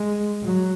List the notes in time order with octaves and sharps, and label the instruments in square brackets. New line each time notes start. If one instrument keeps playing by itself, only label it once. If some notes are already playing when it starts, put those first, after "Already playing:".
Already playing: [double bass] G#3
F#3